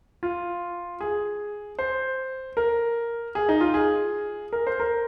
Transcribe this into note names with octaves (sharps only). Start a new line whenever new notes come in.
F4
G#4
C5
A#4
G#4
D#4
F4
G#4
A#4
C5
A#4